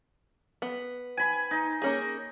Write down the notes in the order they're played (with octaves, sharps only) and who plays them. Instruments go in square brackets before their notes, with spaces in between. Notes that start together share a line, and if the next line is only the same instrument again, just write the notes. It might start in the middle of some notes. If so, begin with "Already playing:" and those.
[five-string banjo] B3
[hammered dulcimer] G#5 B5
D#4
[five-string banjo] A#3 C#4 G#4